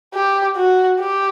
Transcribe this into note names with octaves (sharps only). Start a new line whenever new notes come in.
G4
F#4
G4